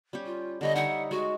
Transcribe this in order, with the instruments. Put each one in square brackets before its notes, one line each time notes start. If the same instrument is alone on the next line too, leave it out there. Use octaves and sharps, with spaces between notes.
[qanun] G3 C#4 G4
[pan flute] F4
[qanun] D3 G3 C#5 [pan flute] D#5
[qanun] D#4 C#5 E5 [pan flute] F#5
[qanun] G#3 [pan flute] F#4